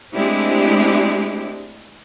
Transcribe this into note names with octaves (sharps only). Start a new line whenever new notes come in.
G#3 A3 C4 D4 E4 G4